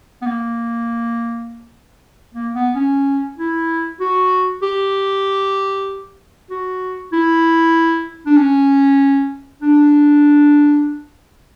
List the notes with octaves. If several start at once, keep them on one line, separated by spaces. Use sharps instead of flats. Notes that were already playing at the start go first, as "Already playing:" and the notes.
B3
A#3
A#3
B3
C#4
E4
F#4
G4
F#4
E4
D4
C#4
D4